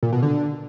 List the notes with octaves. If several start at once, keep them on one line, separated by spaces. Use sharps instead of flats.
A#2
B2
D3